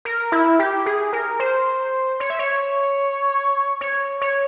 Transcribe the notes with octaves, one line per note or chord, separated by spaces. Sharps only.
A#4
E4
G4
G#4
A#4
C5
C#5
E5
C#5
C#5
C#5